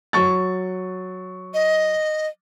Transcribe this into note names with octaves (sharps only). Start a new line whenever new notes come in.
F#3 C#6 A6
D#5